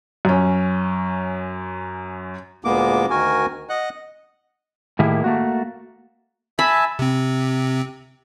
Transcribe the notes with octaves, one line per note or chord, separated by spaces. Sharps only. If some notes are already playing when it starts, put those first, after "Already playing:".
F#2 C#4
D2 A#2 G#3 A#3 B3 D6
D2 D#3 F#4 A#4 G#5
D#5 F#5 F#6
A2 D#3 A#3 E4 G4 G#4
A3 A#3 F#4
E5 G#5 A5 B5
C3 C4